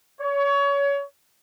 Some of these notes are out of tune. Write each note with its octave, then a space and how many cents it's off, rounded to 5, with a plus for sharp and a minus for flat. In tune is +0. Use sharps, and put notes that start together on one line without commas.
C#5 +25